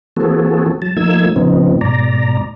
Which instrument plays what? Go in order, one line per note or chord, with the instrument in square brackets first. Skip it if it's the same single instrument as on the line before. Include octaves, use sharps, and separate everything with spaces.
[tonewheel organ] E3 A#3 C4 F#4 G#4 A4
F#3 A5
F3 A3 A#3 D#4 E6 G#6
A2 C#3 F3 B3 C4 D#4
G#2 B2 D5 A#5